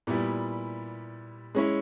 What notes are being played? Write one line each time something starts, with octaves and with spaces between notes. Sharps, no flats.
A#2 G3 B3 E4 G4
G#3 C#4 E4